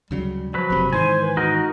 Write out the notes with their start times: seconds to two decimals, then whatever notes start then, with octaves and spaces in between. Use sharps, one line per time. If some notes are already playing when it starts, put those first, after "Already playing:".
0.11 D2 C#3 F#3 G3
0.54 F3 F#3 B4
0.70 F#1 C3
0.93 G#2 D#3 E3 C5 G#5
1.22 B4
1.37 D#4 F#4 A#4